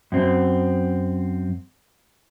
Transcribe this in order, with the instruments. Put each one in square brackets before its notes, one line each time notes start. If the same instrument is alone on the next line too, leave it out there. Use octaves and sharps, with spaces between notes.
[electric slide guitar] F#2 C4